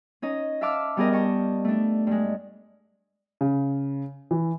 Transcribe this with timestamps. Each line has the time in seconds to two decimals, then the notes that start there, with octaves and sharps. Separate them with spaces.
0.22 C#4 D#4 D#5
0.61 E5 F5 A5 D6 E6 F6
0.97 G3 B3 G4 G#4 A#4 D#5
1.12 D#5 G5 A5 C#6
1.65 A3 D4
2.07 G2 G#3
3.41 C#3
4.31 E3